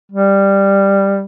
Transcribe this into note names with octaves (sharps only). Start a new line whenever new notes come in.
G3